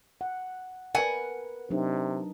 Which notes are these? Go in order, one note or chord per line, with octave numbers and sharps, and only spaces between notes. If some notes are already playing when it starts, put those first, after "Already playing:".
F#5
A#4 B4 F#5 G#5
C3 F#3 D4 D#4